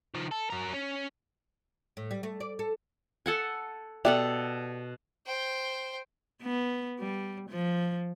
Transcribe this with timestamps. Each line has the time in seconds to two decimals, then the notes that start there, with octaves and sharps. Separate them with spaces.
0.14 D#3 F3
0.31 A4
0.50 F#3 A#4
0.73 C#4
1.97 A2
2.11 G3
2.23 A3
2.40 D5
2.59 A4
3.26 A4 F#5 G#5
4.05 B2 G4 A4 D5 E5 F#5
5.26 C5 G5
6.43 B3
7.00 G3
7.50 F3